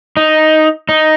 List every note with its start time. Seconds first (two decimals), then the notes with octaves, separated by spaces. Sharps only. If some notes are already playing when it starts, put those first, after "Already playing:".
0.17 D#4
0.89 D#4